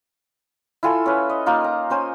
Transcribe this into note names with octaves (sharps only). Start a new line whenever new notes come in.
E4 F4 A4 G#5
C#4 B4
D#5
A#3 D#4 F4
A#5
C#4 C5 G#5